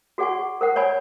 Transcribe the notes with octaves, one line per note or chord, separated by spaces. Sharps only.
F#4 G#4 D5 F#5 G#5 C#6
A#4 C5 F#5
C#5 D5 G#5 B5